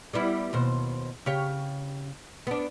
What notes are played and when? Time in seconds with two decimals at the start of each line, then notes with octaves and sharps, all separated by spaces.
0.13 G3 B3 E4
0.53 D#2 B2 C5
1.26 C#3 G4 C#5
2.47 B3 D4